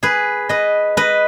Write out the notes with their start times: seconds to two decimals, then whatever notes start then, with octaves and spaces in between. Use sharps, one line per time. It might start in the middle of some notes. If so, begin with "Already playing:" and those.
0.03 G#4 B4
0.49 B4 D#5
0.97 B4 D#5